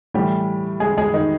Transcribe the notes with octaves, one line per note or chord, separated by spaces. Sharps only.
A2 E3 G3 G4
G#3 G#4
G#3 G#4
D#3 D#4